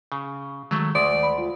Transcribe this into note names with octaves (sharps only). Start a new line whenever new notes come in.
C#3
D#3 F#3 G#3 A3
D2 D5 C6 D6 D#6
B5
F4